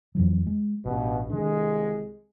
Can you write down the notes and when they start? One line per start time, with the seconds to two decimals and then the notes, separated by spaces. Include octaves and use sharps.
0.15 F2 E3 F#3
0.47 G#3
0.86 A1 G2 B2
1.30 C2 D#3 G#3 D4